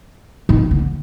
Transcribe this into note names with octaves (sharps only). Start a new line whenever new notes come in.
D#3
D3